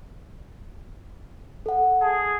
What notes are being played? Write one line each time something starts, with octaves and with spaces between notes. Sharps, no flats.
A4 F#5
G#4 A5